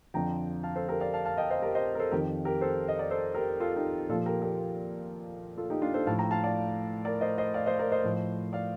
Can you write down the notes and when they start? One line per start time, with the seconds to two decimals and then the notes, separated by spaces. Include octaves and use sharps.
0.14 F2 D3 F3 G5 A#5
0.63 F5 A5
0.76 A4 C5
0.88 G4 A#4
1.00 D5 F5
1.14 F5 A5
1.25 F5 A5
1.38 D#5 G5
1.50 C5 D#5
1.62 G4 A#4
1.75 C5 D#5
1.95 A#4
1.99 A4 C5
2.11 F2 D#3 G4 A#4
2.45 G4 A#4
2.61 A4 C5
2.88 D#5
2.99 D5
3.10 A4 C5
3.35 G4 A#4
3.60 F4 A4
3.76 D#4 G4
4.09 A#2 F3 F4 A4
4.25 G4 A#4
4.41 G4 A#4
5.57 F4 A4
5.70 D#4 G4
5.82 D4 F4
5.94 A4 C5
6.06 A2 F3 F5 A5
6.18 G5 A#5
6.31 F5 A5
6.43 D5 F5
7.05 A#4 D5
7.21 C5 D#5
7.38 C5 D#5
7.54 D5 F5
7.66 C5 D#5
7.79 A#4 D5
7.92 C5 D#5
8.04 A2 F3
8.53 D5 F5